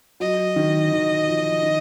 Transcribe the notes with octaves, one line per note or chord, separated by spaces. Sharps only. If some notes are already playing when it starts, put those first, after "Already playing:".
F#3 D#5
D#3
D#3
F3
D#3